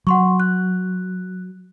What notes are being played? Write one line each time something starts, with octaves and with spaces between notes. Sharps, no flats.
F#3 F#5 C6 C#6
F#6